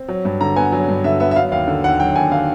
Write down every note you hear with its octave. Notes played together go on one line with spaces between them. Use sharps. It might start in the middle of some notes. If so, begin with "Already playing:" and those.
Already playing: C4
F#3
G2
D3 A#5
B3 G#5
F#3
G2
D3 E5
B3 E5
E5
F#3 F5
D#2 F5
D3
D#2 F#5
F#3 G5
D#2 G#5
D3 F5